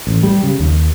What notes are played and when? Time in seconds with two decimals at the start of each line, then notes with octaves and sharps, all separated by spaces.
0.07 A1
0.23 G3
0.43 C#3
0.59 D#2